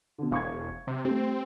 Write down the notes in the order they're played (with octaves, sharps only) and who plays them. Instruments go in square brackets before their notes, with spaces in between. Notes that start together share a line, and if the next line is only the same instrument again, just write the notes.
[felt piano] B2 D3
[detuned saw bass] E1 [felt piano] F5 C#6 G#6
[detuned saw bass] C3
[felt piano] G3 A3 [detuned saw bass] C4